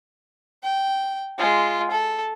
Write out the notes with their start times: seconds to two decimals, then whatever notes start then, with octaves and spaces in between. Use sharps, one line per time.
0.63 G5
1.38 G#3 F4
1.91 A4